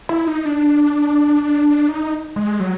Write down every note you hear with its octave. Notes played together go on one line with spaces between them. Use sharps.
E4
D#4
D4
D#4
G#3
F#3